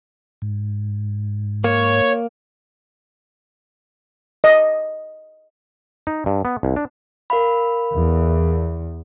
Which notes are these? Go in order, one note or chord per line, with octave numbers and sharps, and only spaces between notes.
G#2
A#3 C#5
D#5
D#4
G2
B3
C2
D4
A#4 F5 B5
E2